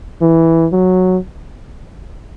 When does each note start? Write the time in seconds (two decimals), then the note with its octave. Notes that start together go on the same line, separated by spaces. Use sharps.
0.21 E3
0.72 F#3